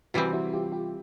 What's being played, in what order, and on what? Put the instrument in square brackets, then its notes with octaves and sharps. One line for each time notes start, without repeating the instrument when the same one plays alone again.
[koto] C3 E3 G3 C4 [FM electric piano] E4 F#4
[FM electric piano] E4 F#4
F4 G4
F4 G4